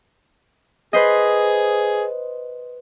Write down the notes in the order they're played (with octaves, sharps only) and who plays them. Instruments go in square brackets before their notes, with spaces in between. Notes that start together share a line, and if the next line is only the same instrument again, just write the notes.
[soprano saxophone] G#4 [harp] B4 C5 D#5